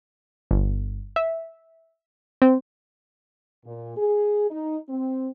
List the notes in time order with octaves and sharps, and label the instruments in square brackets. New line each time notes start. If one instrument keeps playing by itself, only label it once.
[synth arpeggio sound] G1
E5
C4
[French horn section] A#2
G#4
D#4
C4